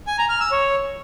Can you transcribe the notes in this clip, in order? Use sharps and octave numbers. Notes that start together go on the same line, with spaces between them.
G#5
A#5
F6
E6
C#5